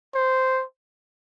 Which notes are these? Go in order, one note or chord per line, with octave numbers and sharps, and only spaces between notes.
C5